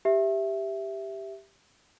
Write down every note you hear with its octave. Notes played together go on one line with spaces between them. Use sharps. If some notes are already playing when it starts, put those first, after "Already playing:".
G4 E5